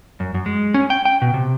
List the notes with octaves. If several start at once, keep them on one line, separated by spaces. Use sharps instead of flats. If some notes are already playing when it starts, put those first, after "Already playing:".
F#2
F#2
G#3
C#4
G5
G5
B2
C3